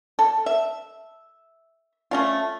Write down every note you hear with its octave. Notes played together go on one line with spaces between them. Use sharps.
A4
E5
A3 C#4 F4